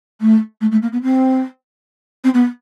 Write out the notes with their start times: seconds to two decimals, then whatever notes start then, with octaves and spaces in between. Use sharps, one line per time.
0.20 A3
0.61 A3
0.71 A3
0.82 A#3
0.92 B3
1.02 C4
2.24 C4
2.34 B3